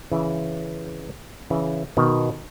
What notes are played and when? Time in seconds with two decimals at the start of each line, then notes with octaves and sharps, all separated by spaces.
0.12 C#3 E3
1.50 C#3 E3
1.97 B2 D#3